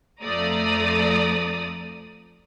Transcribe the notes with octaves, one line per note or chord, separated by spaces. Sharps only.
F2 F3 A3 D5 A#5 D#6